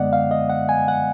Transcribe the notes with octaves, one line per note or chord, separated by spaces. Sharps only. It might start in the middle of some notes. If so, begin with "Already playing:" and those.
Already playing: F#2 D3 G#3 B3 D5 D#5 F#5
F5
D#5
F#5
G#5
F#5